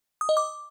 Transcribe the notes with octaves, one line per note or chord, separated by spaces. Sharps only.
D#6
D#5
D6